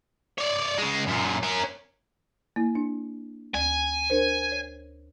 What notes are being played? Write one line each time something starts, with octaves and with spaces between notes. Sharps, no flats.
C#5 D5
C#3 G#3
F#2 A#2
C#4 A#4
A#3 E4
D4
D2 G#5
D4 A#4 C5
C#5